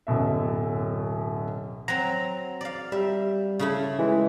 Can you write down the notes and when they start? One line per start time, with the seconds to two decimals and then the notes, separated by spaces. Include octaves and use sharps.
0.07 D1 F#2 B2 E5
1.88 F#3 C4 A#5
2.61 D5 F5
2.92 G3 E5
3.59 C#3 A3 E4
3.99 E3 G#3